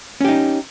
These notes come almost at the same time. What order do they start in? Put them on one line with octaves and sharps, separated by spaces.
C#4 G4 D#4